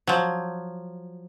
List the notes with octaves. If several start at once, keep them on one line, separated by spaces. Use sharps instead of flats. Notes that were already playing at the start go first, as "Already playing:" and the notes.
F3 F#3